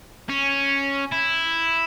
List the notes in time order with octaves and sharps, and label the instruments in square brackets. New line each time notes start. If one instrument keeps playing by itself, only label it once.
[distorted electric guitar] C#4
E4